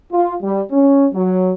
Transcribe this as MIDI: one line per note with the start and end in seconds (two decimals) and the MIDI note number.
0.12 0.33 65
0.41 0.62 55
0.71 1.07 61
1.13 1.52 54